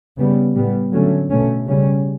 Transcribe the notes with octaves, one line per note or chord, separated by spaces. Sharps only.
C#3 G3 B3
A2 G3 B3
D3 F#3 A3 C#4
B2 A3 C#4
C#3 G3 C#4